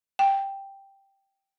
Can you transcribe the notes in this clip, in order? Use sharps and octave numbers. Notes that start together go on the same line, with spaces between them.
G5